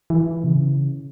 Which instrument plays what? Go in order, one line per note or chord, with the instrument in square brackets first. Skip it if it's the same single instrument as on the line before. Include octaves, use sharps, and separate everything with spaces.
[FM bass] E3
B2
C#3